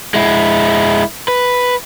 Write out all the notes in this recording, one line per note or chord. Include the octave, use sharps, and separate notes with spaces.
G#3 E4
B4